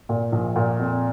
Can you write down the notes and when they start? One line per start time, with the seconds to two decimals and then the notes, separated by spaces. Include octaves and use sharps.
0.09 A#2
0.32 A#1
0.56 A#2
0.80 F2